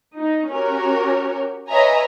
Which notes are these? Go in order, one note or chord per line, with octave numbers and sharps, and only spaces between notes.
D#4
C#4 F#4 G4 A#4 C#5
B4 C#5 D#5 E5 G#5 A#5